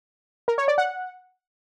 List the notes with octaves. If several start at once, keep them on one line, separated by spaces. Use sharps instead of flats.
A#4
C#5
D5
F#5